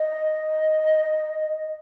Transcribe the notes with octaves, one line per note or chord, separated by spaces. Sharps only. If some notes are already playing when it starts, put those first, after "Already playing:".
Already playing: D#5